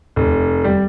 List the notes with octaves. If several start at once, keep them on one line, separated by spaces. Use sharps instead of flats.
F1
G3